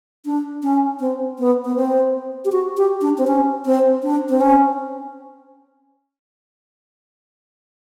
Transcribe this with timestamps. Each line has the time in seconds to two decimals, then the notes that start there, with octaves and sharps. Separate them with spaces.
0.25 D4
0.63 C#4
1.00 C4
1.38 B3
1.65 B3
1.76 C4
2.45 G4
2.52 F#4
2.77 G4
3.01 D4
3.18 C4
3.27 C#4
3.65 C4
4.03 D4
4.29 C4
4.41 C#4